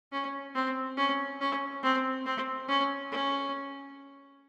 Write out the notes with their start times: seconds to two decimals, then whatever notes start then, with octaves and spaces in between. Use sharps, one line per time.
0.12 C#4
0.55 C4
0.97 C#4
1.40 C#4
1.83 C4
2.26 C4
2.68 C#4
3.12 C#4